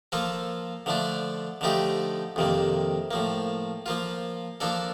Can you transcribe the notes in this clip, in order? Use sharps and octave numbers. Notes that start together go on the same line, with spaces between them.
F3 A#3 F4 A4
D3 F3 A3 D4
D3 F3 A3 D#4 G4
F2 C3 D#3 A#3
A2 F3 A#3
F3 A#3 F4
F3 A#3 D4 A4